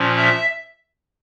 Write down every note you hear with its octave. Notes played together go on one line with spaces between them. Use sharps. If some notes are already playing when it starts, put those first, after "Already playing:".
Already playing: A#2 F3 C#4
E5